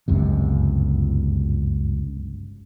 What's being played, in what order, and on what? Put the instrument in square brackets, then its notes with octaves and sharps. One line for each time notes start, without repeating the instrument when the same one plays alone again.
[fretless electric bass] G1 C#2 F#2 C3